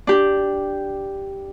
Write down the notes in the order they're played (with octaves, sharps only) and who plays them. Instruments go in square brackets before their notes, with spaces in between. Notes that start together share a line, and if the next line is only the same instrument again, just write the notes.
[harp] D4 G4